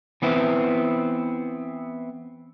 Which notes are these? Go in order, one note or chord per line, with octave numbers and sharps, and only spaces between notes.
E3 B3 C4 E4